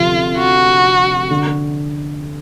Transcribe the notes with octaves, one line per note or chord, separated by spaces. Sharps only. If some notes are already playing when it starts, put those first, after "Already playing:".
Already playing: D2 C3 F3 F4
F#4
D3